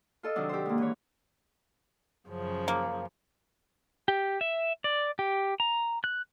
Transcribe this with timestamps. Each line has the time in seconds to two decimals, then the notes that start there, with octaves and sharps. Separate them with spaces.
0.23 F4 A4 D#5
0.36 C3 D#3 F#3 D4
0.49 G4 C5
0.66 G#2 A#3
0.78 E3 C#5
2.28 F#2 C#3 F3
2.68 A#3
4.08 G4
4.41 E5
4.84 D5
5.19 G4
5.60 A#5
6.04 F#6